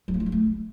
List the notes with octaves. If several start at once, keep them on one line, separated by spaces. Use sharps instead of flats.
F#3
A3
F4
G3
A3